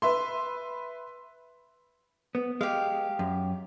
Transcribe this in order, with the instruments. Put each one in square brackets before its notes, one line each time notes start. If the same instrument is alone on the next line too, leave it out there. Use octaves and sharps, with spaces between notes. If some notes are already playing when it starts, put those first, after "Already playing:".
[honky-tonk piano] B4 E5 C6
[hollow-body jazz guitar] B3
[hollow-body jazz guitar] G#3 [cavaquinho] G4 F5
[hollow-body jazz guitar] F#2